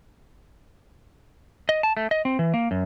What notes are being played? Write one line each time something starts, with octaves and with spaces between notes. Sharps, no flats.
D#5
A5
A3
D#5
C4
E3
A#3
F#2